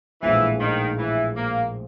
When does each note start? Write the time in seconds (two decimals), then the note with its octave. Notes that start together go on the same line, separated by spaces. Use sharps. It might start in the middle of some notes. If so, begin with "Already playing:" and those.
0.22 A#1 A2 E3 F3 G#3
0.60 D#3
0.98 E3
1.35 A#3